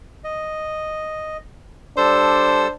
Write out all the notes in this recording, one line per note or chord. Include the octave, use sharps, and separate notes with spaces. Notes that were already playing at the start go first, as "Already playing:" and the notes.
D#5
G3 D4 A4 C5 E6